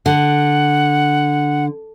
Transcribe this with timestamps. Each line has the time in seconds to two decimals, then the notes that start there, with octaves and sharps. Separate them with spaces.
0.06 D3 F#5